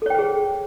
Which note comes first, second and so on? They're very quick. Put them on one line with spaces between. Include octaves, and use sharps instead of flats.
A4 C#5 G5 C5 G#4